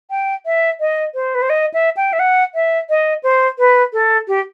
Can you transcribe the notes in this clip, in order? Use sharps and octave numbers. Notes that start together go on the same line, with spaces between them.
G5
E5
D#5
C5
B4
C5
D#5
E5
G5
E5
F#5
E5
D#5
C5
B4
A4
G4